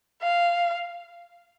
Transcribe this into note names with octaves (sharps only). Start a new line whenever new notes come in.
F5